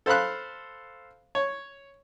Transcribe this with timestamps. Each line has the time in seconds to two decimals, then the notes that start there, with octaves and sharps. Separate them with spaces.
0.06 A4 C5 F5 B5 F#6
1.35 C#5